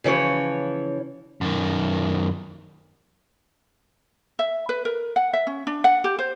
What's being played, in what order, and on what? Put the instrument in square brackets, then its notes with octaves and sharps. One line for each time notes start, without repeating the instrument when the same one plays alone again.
[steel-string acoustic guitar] C#3 E3 F3 C#5
[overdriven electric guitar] F#2 D#3
[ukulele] E5
B4
A#4
F#5
E5
C#4
D4
F#5
G4
C5